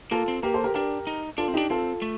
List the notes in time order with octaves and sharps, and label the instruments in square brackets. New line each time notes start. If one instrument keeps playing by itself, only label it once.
[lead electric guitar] A#3 [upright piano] F4 A4
[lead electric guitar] C4
[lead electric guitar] A#3 [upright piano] G4 A#4
[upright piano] A4 C5
G4 A#4
[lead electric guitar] D4 [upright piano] G4 A#4
[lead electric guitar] D#4
[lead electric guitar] D4 [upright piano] F4 A4
[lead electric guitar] C4
[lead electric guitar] D4 [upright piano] D#4 G4
[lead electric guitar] C4 [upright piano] F4 A4
[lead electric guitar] A3